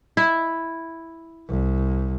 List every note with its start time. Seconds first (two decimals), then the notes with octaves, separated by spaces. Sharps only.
0.17 E4
1.49 C2